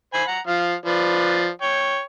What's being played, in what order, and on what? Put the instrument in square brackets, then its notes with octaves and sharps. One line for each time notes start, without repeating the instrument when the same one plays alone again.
[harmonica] C5 G#5 B5
F#5 A#5
F3 F5
F3 B4 D5
C#5 G5